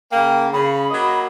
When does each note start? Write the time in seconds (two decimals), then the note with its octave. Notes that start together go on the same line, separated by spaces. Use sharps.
0.12 C#3 A#3 G5
0.53 C#3 B5
0.91 F#3 A#3 D#5